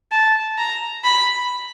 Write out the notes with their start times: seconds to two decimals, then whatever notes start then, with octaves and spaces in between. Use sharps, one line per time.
0.12 A5
0.58 A#5
1.04 B5